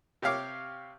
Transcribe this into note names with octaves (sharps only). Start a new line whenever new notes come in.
C3 G4 C#5 F5 D6